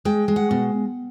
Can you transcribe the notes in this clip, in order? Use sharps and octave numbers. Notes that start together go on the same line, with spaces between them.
G#3 G5
G#3
F#5
B2